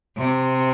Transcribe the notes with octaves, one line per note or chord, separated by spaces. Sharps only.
C3